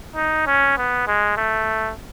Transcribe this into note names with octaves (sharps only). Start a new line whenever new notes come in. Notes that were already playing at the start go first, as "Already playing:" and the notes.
D#4
C#4
B3
G#3
A3